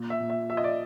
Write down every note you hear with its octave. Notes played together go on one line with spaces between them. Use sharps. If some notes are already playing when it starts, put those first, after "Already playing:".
Already playing: A#2
E5
A#2
E5
F3 E5
D#5
D5